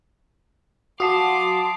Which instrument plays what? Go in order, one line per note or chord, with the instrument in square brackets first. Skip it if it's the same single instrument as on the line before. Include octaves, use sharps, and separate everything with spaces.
[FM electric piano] F#4 [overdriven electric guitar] F5 A5 [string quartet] C6 D6 [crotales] D#6 C7